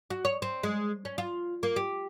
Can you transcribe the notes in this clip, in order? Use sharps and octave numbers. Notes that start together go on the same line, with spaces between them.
F#4
C#5
C4
G#3
C#4
F4
A#3
G4